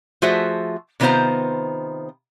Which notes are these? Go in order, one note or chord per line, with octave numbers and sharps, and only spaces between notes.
F3 A3 F#4 G#4 C5 E5
C3 D#3 B3 F4 C5 A#5